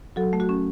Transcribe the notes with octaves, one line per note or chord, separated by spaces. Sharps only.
F#3 F#4 A4
A3
F#4
C#4